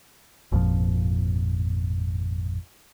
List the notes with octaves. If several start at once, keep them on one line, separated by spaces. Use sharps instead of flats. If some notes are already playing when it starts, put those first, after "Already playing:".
G#1 F2 A#2 F3